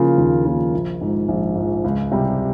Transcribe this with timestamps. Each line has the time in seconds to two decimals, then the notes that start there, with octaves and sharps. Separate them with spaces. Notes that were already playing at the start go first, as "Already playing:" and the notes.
Already playing: C#3 F3 A#3 F4
0.18 D#2
0.45 C#3 F3 A#3 F4
0.73 A#1
1.01 G#2 F3
1.28 A#1
1.56 G#2 F3
1.84 C#2
2.12 C3 G3